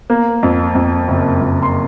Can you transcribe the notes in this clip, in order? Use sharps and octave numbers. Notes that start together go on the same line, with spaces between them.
A#3
F2
F2
F#1
F2
C6